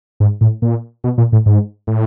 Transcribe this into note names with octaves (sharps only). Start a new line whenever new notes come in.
G#2
A2
A#2
B2
A#2
A2
G#2
A2